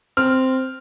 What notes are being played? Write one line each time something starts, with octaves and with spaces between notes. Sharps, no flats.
C4 F6